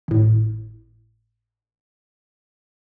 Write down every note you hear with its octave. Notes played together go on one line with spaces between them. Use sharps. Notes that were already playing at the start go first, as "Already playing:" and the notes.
G#1 A2